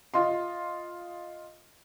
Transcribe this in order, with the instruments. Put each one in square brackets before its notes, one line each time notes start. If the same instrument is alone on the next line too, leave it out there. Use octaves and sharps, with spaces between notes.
[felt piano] F4 D#5 C6